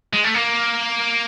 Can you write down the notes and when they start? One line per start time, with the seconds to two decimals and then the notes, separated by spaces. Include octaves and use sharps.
0.13 G#3
0.24 A3
0.35 A#3